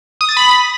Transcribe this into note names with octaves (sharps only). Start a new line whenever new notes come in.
D#6
A6
B5